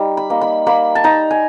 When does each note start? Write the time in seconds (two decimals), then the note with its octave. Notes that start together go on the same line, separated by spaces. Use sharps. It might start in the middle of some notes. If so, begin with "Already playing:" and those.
Already playing: G3 D#4
0.17 B5
0.30 A#3 D#4
0.41 B5
0.67 A#3 B5
0.95 A5
1.04 D#4 A#5
1.31 G#5